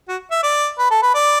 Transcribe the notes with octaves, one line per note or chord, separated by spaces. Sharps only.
F#4
E5
D5
B4
A4
B4
D5